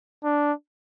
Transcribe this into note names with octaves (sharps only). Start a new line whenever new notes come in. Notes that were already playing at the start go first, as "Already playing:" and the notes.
D4